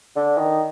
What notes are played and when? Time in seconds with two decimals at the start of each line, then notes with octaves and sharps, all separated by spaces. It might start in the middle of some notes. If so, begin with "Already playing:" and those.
0.16 D3
0.38 D#3